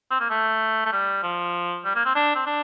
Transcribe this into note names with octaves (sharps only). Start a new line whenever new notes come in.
C4
A#3
A3
A3
G3
F3
G3
A#3
C4
D4
C4
D4